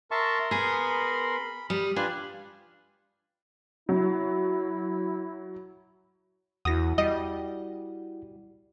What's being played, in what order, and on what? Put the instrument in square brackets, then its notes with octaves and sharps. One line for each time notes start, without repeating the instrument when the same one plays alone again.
[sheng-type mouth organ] A#4 C6 [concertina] E5 A5 C#6
[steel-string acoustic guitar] B3 G#4 [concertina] B5
[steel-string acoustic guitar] G3 [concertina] D#6 F6
[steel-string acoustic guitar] D4 [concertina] F4 G4 B4 [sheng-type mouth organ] G#5
[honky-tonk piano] F#3 [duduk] E4
[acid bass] E2 [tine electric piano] E4 F#4 F#5 [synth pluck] D#6 A#6
[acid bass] G3 [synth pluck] D#5